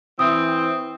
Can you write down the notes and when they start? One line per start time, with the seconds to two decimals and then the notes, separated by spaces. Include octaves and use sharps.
0.19 E3 C4 D#6